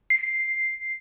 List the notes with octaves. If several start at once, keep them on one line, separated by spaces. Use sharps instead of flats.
C7